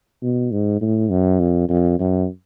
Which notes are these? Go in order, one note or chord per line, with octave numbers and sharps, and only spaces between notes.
B2
G#2
A2
F#2
F2
F2
F#2